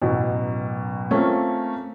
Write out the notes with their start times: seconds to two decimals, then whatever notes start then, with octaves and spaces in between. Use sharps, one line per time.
0.01 A1 F#2 B2 F#3
1.11 A3 A#3 C4 C#4 F4